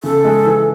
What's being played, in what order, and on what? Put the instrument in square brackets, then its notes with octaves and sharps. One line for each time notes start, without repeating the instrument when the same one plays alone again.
[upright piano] C#3 [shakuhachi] A4
[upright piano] G#3
E3